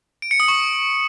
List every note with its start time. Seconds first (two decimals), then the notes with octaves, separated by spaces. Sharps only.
0.22 D7
0.31 C#7
0.40 D#6
0.48 C#6